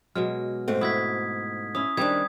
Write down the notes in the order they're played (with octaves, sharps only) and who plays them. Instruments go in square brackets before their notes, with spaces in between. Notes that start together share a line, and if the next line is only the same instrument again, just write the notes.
[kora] B2 F#3 G#3 [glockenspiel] F6
[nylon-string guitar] G#2 A3 C4
[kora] E4 F#4 [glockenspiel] D#6 G#6 B6
[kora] C#4 E4 [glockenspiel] D#6
[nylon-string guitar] D#3 C4 D4 [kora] G3 [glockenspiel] D#6 G#6